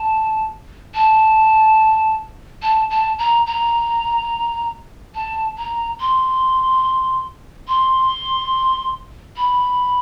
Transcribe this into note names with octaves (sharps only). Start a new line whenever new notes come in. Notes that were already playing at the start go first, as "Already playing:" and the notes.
Already playing: A5
A5
A5
A5
A#5
A#5
A5
A#5
C6
C6
B5